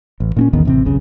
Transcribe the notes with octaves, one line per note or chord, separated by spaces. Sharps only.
A1
A#2 C4 C#4
A1 E2 D#3 B3
A1 C3 C4
F1 B1 C#3